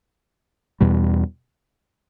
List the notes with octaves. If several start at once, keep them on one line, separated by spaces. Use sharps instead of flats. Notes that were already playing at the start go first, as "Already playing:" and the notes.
E2 B2 G3